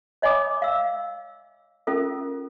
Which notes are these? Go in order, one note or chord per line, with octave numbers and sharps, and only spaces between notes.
C#5 D#5 G#5 B5 D6 D#6
F5 E6
C#4 F4 A4 A#4